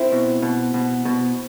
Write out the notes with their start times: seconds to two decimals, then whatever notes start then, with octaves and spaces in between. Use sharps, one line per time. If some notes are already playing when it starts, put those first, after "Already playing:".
Already playing: C4 E4
0.12 B2
0.43 B2
0.74 B2
1.05 B2